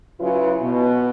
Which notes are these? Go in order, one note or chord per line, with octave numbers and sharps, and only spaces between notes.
C#3 F#3 E4 F4 B4
B2